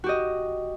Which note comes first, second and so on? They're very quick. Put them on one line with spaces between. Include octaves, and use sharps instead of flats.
F#4 G4 D#5